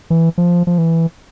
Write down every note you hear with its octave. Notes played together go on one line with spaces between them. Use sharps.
E3
F3
F3
E3